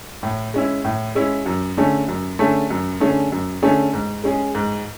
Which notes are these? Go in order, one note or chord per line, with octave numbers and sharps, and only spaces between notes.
A2
G#3 C#4 E4
A2
G#3 C#4 E4
F#2
D3 A3 C#4 G#4
F#2
D3 A3 C#4 G#4
F#2
D3 A3 C#4 G#4
F#2
D3 A3 C#4 G#4
G#2
G#3 C#4 G#4
G#2